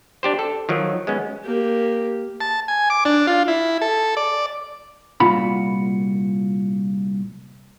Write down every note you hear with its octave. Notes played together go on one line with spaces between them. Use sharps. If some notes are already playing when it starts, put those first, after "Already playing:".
D4 G4 C5
A4
D#3 F3 F#3
G#3 B3 C#4
A#3 G4
A5
G#5
D6
D4
F4
E4
A4
D5
C2 A#2 F4 F#4 B5